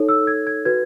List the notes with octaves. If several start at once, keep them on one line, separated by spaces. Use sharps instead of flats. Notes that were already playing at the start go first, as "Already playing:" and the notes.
Already playing: D#4 A4 C#5
E6
G#6
G#6
F#4 B4 G#6